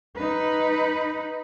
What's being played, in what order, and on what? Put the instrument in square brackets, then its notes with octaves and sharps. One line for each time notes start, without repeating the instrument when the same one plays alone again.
[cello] D#4 B4